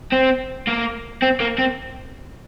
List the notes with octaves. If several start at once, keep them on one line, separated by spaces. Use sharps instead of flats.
C4
A#3
C4
A#3
C4